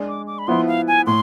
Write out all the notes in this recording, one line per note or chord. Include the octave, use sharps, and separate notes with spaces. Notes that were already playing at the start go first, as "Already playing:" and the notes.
Already playing: G#3 D4 G#4 D5
D6
D6
B5
F3 B3 E4 C6
F5
G#5
A2 C6